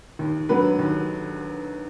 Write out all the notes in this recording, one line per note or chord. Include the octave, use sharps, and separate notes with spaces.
D#2
D3 F#3 B4
D#2